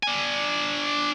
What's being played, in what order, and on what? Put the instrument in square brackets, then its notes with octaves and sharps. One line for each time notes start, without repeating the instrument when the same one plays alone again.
[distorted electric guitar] D4 G#5